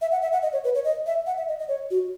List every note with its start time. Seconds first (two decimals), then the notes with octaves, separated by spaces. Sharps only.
0.01 E5
0.12 F#5
0.22 E5
0.32 F#5
0.42 D#5
0.53 C#5
0.64 B4
0.75 C#5
0.84 D#5
1.07 E5
1.27 F#5
1.37 E5
1.48 D#5
1.59 D#5
1.68 C#5
1.91 F#4